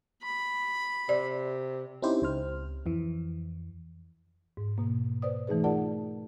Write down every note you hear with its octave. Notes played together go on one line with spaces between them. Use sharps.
B5
C3 D5
C4 C#4 D#4 E4 G4 C5
C#2 C5 F6
F2 E3
G#2
B2 A#3
B4 C5 D5 D#6
E3 A3 D#4 G#4 B4
F4 A#4 D5 F#5 A5